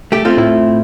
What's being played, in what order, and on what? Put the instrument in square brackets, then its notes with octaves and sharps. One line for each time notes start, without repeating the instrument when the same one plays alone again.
[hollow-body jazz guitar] A3 G4
A3 C4 F4
[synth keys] A2 E4